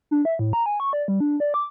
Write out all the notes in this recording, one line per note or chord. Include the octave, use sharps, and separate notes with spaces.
D4
E5
A2
A#5
G#5
C#6
D5
G3
D4
D5
D6